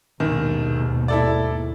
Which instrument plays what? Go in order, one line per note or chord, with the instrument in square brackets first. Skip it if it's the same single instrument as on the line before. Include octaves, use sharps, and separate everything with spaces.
[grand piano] A#1 D#3 [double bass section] D#2 G#2 B2
[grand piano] E4 A4 D5